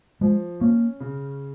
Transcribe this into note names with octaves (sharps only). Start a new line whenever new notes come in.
F3 G#3
A#3 C#4
C#3